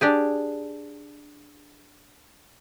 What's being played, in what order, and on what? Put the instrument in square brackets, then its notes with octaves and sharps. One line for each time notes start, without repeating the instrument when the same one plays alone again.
[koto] D4 G4 G#4